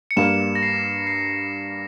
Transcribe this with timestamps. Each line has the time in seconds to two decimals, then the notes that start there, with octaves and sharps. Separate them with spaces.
0.11 C#7
0.17 G2 G3 A#3 E7
0.55 A#6
0.63 C7
1.07 C7